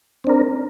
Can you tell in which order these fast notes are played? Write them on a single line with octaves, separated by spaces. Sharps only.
C4 D4 A#4